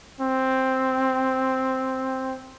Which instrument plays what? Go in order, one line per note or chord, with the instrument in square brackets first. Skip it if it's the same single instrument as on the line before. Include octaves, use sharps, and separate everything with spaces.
[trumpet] C4